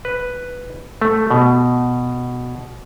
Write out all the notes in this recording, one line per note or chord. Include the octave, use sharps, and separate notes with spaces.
B4
A3
B2